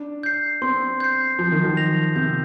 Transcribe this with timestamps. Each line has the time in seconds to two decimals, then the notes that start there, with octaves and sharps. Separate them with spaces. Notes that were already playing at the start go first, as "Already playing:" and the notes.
Already playing: D4
0.23 G6 C7
0.62 C4 C6
1.00 G6 C7
1.39 F3 G6
1.52 D#3
1.64 F3
1.77 A#6 F7
2.16 C3 G6